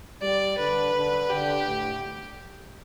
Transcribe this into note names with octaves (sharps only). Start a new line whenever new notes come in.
G3 D5
D3 B4
D3
D3 G4
A2